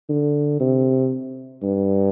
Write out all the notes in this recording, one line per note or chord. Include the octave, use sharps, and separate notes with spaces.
D3
C3
G2